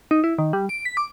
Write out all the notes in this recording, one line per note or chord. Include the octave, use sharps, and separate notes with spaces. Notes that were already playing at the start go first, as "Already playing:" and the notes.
D#4
E4
D#3
G3
D7
B6
D6